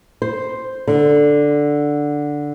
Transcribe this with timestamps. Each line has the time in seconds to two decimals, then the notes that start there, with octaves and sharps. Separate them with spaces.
0.22 C5
0.88 D3